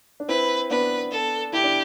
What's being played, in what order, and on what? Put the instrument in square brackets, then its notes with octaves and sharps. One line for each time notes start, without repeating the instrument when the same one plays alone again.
[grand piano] D4
[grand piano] C4 E4 [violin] B4
[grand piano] B3 D4 [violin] B4
[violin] A4
[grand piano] E4 [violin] G4
[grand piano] D4